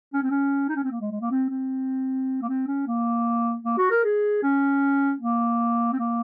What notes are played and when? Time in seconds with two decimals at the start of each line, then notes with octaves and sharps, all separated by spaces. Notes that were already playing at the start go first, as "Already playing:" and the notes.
0.14 C#4
0.23 C4
0.30 C#4
0.69 D#4
0.76 C#4
0.84 C4
0.92 A#3
1.01 G#3
1.11 G#3
1.21 A#3
1.31 C4
1.50 C4
2.42 A#3
2.48 C4
2.67 C#4
2.87 A#3
3.65 A#3
3.78 F#4
3.91 A#4
4.04 G#4
4.43 C#4
5.20 A#3
5.93 C4
5.99 A#3